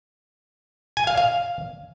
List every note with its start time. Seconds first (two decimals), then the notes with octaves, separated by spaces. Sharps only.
0.97 G#5
1.07 F5
1.17 F5